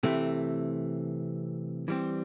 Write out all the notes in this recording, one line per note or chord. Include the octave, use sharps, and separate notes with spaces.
C3 E3 A3 C4
E3 G3 C4